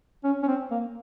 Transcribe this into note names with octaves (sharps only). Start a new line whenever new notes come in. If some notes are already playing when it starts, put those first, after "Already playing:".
C#4
C#4
C4
A#3